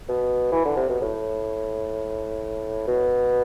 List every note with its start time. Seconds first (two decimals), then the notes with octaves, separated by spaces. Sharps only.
0.09 B2
0.52 E3
0.65 D3
0.77 C3
0.89 B2
1.01 A2
2.87 B2